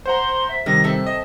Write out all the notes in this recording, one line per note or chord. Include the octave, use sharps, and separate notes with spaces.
C5 F#5 A#5 C6
E5
C3 D#3 G3 A#6
C4 A4 E5 A5
D#5